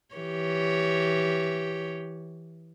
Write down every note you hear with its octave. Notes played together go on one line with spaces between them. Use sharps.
E3 G4 C#5